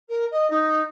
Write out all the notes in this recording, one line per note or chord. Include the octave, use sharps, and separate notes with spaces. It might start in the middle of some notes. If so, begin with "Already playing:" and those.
A#4
D#5
D#4